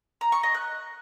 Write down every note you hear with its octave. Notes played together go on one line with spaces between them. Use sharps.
A#5
C#6
D#5
F#6